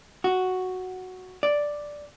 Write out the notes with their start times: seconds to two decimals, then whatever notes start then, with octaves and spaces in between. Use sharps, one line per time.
0.24 F#4
1.43 D5